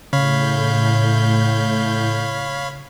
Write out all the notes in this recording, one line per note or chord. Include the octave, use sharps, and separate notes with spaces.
A2 C#3 C#5 F5 B5 G6